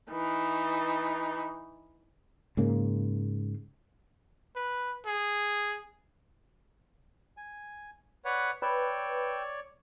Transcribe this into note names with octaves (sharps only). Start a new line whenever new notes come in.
E3 D#4
G#2 C#3 A#3
B4
G#4
G#5
B4 C#5 D5 F#5
B4 C#5 D5 G5 E6